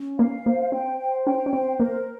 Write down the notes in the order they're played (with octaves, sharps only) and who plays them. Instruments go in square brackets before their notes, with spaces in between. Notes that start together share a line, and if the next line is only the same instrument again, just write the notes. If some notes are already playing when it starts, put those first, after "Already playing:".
Already playing: [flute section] C#4
[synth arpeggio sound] A#3 [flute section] F5
[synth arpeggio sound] A#3 [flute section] C5
[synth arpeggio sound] C4 [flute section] G5
[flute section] C5
[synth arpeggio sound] C#4 [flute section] G5
[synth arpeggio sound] C#4
[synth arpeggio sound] C4 [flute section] C5
[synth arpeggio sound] A#3 [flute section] A#4